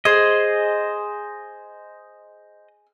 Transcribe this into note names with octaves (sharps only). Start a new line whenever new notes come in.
G#4 C5 D#5